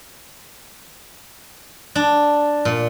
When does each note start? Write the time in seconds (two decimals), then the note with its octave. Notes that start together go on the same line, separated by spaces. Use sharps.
1.95 D4
2.65 A#2